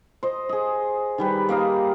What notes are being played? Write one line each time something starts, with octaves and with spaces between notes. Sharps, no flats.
C5 D#5
G#4 D#5
D#3 G3 B4
A#3 D5 D#5 F5